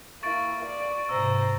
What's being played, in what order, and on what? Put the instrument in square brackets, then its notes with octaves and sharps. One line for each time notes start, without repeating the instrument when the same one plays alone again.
[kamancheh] A#3 E4 [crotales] C#6 A6 D7
[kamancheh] D5
[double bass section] G#2 C3 [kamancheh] C5 A#5 [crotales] E6